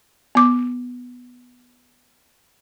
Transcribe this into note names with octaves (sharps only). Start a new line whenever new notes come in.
B3 D6